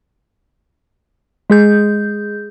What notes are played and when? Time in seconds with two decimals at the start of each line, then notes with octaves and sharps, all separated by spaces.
1.50 G#3 G#4 G6